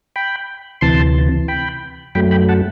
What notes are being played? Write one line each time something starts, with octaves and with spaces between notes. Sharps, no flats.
G5 B5
D2 C3 E3 A5 C6
G5 B5
F#2 F#3 A3 G5 B5
G5 B5
F#5 A5